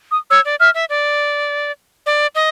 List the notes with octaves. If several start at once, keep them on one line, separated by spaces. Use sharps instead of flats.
D#6
C#5 E6
D5
E5 F6
E5
D5
D5
D#5